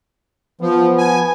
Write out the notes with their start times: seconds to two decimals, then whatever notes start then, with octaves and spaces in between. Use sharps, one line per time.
0.61 F3 B3
0.98 G#5